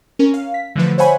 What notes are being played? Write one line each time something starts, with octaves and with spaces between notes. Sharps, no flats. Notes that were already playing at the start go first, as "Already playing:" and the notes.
C#4 A#4
F5
B6
D3 E3 F3 A3 B4
C5 C#5 E5 F#5 G#5 B5